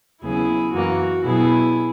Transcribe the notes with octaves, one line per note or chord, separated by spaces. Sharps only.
D#2 C#3 F#3 B3 E4 G#4
F#2 E3 A#3 F#4
B2 F#3 B3 E4 G#4